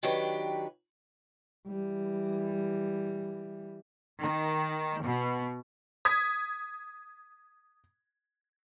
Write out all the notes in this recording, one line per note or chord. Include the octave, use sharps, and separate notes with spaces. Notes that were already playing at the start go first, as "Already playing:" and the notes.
D#3 F#3 D4 G4 B4
E3 G3
D#3
B2
D#6 G#6 B6